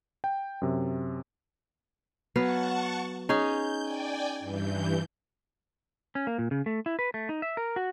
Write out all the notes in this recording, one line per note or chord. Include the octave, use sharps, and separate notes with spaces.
G5
F#2 C3
F#3 B3 F5 F#5 A5 C#6
C#4 D#4 G#4 G6
D5 G5 G#5
G2 E3 G6
C#4
A#3
A#2
C#3
A3
E4
B4
A3
D#4
E5
A#4
F#4